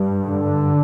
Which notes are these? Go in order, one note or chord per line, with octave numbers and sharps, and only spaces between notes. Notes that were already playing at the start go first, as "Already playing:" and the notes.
Already playing: G2
D3